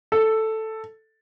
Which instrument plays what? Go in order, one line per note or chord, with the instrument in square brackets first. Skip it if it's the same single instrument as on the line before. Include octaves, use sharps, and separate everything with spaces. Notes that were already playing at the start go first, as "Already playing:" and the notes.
[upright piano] A4